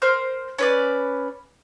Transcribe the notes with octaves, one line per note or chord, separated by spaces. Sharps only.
A#4 C5 F6
C#4 B4 D5